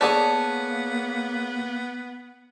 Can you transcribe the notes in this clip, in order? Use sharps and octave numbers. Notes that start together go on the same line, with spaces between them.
A#3 B3 G#4 A4 C#5 D5 A5